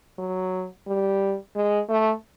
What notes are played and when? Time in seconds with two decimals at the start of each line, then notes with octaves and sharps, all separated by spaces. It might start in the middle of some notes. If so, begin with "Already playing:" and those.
0.18 F#3
0.87 G3
1.56 G#3
1.89 A3